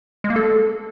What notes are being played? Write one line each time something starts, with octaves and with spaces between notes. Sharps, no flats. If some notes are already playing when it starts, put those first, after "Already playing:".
G#3
A#3
A4